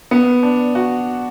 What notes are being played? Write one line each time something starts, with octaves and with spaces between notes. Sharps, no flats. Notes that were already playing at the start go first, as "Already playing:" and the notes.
B3
D4
F#4